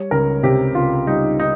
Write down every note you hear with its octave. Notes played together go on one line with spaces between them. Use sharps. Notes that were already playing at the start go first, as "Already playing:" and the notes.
Already playing: G3 C#5
C#2 A#4
C3 G4
C#2 F4
G3 D#4
D#4